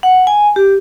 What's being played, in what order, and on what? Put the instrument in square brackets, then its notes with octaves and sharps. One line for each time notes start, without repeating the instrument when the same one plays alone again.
[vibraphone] F#5
G#5
G4